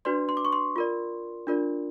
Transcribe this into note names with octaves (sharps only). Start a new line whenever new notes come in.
D4 F#4 B4 D5 C6
C6
D6
C#6
C6
F4 A#4 D5
D4 F4 A#4 D5